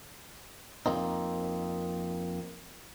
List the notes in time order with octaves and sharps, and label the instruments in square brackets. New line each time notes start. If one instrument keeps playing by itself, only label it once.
[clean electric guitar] F2 A#3 C4 D#4